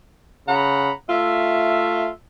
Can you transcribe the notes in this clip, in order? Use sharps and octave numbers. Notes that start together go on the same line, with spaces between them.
C#3 F#5 A#5 B5
A3 F4 E5